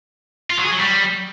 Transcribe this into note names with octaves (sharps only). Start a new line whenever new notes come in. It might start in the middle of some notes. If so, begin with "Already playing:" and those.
F4
F#3
G#4
F#3
G3